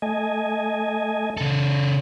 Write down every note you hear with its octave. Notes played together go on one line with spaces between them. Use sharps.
A3 D#5 G#5
C#3 A4